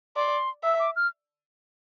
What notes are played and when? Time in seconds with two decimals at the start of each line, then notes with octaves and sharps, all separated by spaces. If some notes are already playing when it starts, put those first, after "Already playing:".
0.16 D5 C6
0.63 E5 E6
0.79 D6
0.96 F6